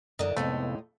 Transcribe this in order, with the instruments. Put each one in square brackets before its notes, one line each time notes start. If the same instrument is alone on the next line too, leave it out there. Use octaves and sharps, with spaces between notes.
[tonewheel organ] F#2 A#4 D#5 [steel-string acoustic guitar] D3 E3 D4
[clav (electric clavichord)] F2 A3 [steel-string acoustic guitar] A2 G#3 D#4 [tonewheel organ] C3 B3